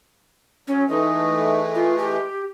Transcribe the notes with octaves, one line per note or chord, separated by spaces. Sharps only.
F#3 C#4
E3 G#3 A3 D#4
F4
G4